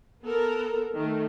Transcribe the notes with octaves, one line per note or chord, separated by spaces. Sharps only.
B3 A4 A#4
D#3 A3